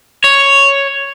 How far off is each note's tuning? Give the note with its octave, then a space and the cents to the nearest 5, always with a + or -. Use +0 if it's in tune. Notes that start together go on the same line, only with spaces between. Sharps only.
C#5 +0